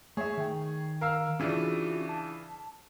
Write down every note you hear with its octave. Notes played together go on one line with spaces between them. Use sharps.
A3 G#4 C#5 E5
D#3 G5
A#4 F5 E6
C#3 E3 C#4 D4 F4 F#4
A5